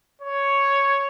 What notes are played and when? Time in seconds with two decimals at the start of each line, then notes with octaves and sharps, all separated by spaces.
0.22 C#5